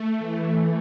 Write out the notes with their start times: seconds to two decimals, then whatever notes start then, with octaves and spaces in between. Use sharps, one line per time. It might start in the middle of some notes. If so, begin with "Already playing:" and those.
Already playing: A3
0.18 E3